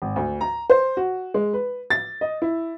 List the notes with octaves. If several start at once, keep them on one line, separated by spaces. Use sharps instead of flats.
G#1
D2
A#5
C5
F#4
G#3
B4
A6
D#5
E4